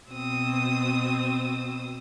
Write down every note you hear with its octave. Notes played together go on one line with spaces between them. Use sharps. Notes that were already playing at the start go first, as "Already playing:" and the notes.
B2 C4 D#6 E6